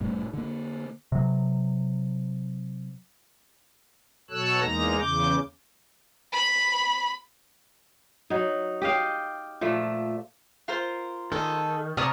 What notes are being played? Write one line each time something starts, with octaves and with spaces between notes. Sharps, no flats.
F1 A2 G3
D3 A#3
C3 F#3
B2 F#3 A4 C#5 E6 F#6
E2 G#3 A#3 D#4 A#5 A#6
E2 C#3 D6 G6
B5
F#3 D#4
G4 D#5 F5 G5
A#2 F3 A3
F4 A#4 C5
D#3 G#4 A4 D#5
C3 C#5 D5 A5 A#5 D#6 F6